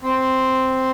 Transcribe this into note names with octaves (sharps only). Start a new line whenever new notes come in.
C4